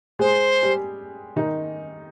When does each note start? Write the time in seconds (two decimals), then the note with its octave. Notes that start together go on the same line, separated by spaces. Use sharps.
0.19 G#3 G#4 C5
0.63 G3 G4
1.36 D#3 D#4